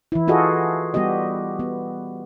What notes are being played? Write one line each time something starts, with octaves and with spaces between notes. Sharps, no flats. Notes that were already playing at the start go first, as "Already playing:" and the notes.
E3 E4
F4 F#4 G#4 A4 D#5
G3 B3 F#4 G4 D#5
B3